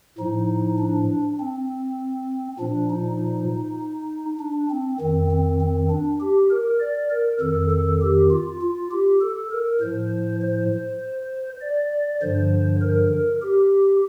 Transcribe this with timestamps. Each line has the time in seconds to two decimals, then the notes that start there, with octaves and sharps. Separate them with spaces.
0.19 A2 F3 D#4
0.79 D4
1.40 C4
2.60 A#2 F3 D4
2.90 D#4
4.40 D4
4.70 C4
5.00 F2 D#3 C4
5.31 C4
5.60 C4
5.90 D4
6.20 G4
6.51 A#4
6.80 D5
7.10 A#4
7.40 F2 D#3 A4
7.70 A4
8.01 G4
8.31 F4
8.61 F4
8.91 G4
9.21 A4
9.51 A#4
9.81 A2 F3 C5
10.41 C5
11.61 D5
12.22 G2 D3 F3 C5
12.82 A#4
13.42 G4